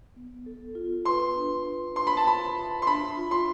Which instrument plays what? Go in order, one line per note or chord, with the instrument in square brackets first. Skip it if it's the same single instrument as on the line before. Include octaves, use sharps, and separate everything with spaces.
[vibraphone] B3
A4
F4
[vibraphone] B4 [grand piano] C6
[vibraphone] D4
B4
[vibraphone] F4 [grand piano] C6
[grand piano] B5
A5
[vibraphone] F4 [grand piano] B5
[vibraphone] E5
[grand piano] C6
[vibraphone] D4 [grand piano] B5
[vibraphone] F4
[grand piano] C6